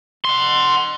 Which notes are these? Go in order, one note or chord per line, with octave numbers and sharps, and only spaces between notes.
F#5 C6